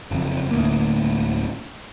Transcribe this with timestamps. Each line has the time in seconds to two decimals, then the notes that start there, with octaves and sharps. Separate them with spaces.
0.11 F#1 F2
0.51 D1 D2 A#3